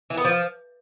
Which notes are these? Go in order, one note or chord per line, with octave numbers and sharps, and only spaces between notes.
E3
B3
F3